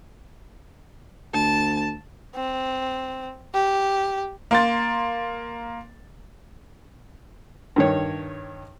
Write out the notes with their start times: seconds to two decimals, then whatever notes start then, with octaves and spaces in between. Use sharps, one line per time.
1.34 D2 A5
2.36 C4
3.54 G4
4.51 A#3 C6 A6
7.76 G2 D#3 C#5